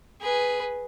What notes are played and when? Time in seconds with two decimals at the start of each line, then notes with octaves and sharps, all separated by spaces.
0.21 G#4 B4